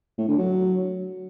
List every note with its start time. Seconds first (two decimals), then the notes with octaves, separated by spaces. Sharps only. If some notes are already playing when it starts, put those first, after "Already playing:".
0.18 A2
0.28 D3
0.38 F#3